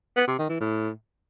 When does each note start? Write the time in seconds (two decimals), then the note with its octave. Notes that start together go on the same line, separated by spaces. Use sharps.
0.16 B3
0.27 C3
0.38 D#3
0.49 E3
0.60 A2